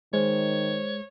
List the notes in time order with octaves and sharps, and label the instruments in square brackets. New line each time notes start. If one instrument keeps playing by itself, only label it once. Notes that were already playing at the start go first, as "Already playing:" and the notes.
[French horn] D#3 [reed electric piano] G#3 [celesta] C5 [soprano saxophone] C#5